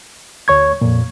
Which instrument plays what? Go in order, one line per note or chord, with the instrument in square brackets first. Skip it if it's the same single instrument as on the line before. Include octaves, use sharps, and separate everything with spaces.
[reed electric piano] D2 C#5 C#6 G#6
F2 A#2